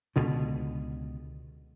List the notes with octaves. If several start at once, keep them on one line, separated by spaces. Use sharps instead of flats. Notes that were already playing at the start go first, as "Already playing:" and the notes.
C#2 B2 D3